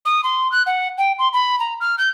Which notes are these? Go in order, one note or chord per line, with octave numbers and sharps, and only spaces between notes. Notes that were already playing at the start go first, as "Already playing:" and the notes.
D#6
C6
F#6
F#5
G5
C6
B5
A#5
F6
G6